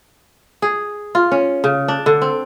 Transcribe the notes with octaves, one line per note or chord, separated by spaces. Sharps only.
G#4
F4
C#4
C#3
D4
D3
C4